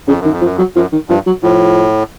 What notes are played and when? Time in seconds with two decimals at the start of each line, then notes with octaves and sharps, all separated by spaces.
0.08 F2 C#3
0.21 F#2 D#3
0.32 F2
0.41 F3
0.45 F#2
0.56 F2
0.58 F#3
0.76 F#2 F3
0.92 D#3
1.09 G2 F3
1.27 F#3
1.43 A2 F3